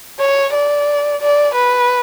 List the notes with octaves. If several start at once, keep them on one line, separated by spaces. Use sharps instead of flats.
C#5
D5
D5
B4